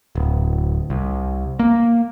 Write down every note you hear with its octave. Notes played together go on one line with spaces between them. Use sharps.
D1
C2
A#3